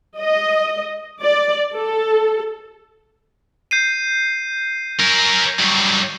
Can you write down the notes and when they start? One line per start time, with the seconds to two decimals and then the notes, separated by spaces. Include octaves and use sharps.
0.20 D#5
1.21 D5
1.75 A4
3.71 G6 C7 D#7
5.00 C#4 A#4
5.60 G2 F#3